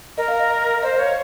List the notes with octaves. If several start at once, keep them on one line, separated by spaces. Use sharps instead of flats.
A#4 D#5
F5
D#5
C5 D#5
C#5 F5